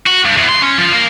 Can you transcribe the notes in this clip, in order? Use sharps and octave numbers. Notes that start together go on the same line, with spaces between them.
F#4
G2
E2
C6
C#4
F3
A#3